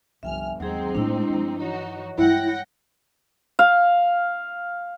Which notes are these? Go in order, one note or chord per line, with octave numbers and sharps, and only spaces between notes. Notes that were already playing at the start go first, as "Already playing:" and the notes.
G1 C2 F3 E5 G5 G#5 F6
D#2 F#3 G#3 C4 D#4 G#4
A2 A3 D4 E4
G2 F3
E3 D#4 F#4 C#5
G2 G#3 E4 F#5 G5 A#6
F5